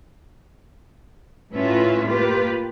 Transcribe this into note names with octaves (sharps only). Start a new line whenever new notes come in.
A2 C#4 F4 B4 E5
A#3 F4 G4 B4